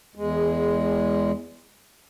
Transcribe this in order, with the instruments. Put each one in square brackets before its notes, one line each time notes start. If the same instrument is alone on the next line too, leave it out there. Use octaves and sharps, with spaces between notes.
[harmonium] E2 G#3